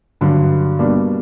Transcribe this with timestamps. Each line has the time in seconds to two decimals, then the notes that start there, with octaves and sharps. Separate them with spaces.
0.21 G2 D3 F#3
0.79 B2 G3 A#3 D4